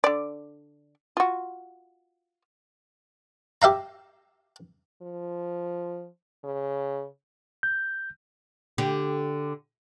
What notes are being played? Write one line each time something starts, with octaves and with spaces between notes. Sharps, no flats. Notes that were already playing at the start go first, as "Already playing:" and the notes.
D3 D5
F4 F#4
G4 E5 F5 A#5
F3
C#3
G6
D3 G4